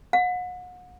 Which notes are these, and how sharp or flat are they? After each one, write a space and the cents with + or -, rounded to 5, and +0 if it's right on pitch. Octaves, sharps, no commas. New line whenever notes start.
F#5 -35